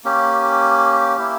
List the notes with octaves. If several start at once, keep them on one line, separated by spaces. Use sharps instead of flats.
A#3 C#4 G4
A#3 E4 G4